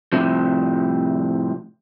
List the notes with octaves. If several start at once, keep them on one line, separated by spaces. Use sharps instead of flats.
A2 C3 F3